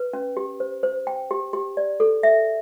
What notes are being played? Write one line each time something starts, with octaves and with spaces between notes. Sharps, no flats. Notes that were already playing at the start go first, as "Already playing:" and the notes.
Already playing: B4
C#4
G4
C5
C5
G5
G4
G4
D5
A4
E5